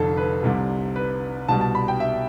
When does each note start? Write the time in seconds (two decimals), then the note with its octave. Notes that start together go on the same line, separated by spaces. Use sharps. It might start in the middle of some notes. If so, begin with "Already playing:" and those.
Already playing: F1 F2 D3 A4
0.17 B4
0.43 C2 C3 G3
0.96 B4
1.48 C2 B2 G3 A5
1.61 A5
1.75 B5
1.88 G5
2.00 E5